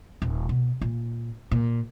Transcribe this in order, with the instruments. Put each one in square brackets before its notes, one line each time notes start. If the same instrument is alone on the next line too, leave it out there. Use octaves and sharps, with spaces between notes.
[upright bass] D#1
B2
A#2
A#2